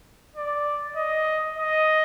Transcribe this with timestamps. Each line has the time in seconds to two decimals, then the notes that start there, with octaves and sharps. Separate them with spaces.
0.36 D5
0.96 D#5
1.56 D#5